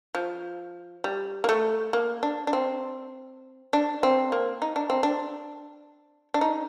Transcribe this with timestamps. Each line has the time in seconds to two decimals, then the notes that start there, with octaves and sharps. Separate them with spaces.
0.15 F3
1.04 G3
1.44 A#3
1.49 A3
1.93 A#3
2.23 D4
2.47 D4
2.53 C4
3.73 D4
4.03 C4
4.32 A#3
4.62 D#4
4.76 D4
4.90 C4
5.03 D4
6.34 D4
6.41 D#4